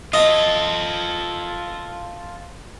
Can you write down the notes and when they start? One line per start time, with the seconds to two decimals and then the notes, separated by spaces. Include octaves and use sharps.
0.13 F4 A4 D#5